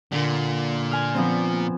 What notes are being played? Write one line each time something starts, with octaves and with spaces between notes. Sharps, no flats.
A#2 D3 A#3
G#5 F6
F3 B3 C4